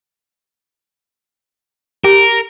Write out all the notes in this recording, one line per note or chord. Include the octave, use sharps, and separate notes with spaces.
G4 A#4